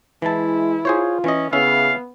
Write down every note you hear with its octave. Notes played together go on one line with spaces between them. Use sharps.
E3 G#3 E4 A5
F4 G#4 C5 C#5
E3 C#4 D#5
C#3 B3 C#4 E4 E5 F5